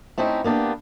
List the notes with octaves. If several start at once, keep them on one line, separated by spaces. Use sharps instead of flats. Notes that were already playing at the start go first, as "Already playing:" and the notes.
A3 C4 C#4 D#4 E4
A#3 B3 D4 G4